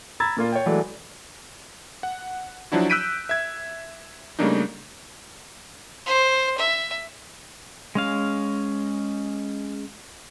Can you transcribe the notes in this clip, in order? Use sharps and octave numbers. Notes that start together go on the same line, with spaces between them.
A#5 B5 E6 G#6 A6
A#2 A#3 F4
C#5 G5
E3 F#3 G#3 A3 D5
F#5
F3 F#3 D4 E4 F#4
E6 F#6 G6 B6 D7 D#7
E5 G#6
C#3 G3 A3 A#3 D4 D#4
C5
E5
G#3 C#4 F5